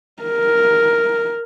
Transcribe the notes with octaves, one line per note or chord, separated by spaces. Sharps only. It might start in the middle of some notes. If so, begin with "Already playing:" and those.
A#4